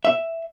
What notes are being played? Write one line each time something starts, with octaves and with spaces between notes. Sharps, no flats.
E5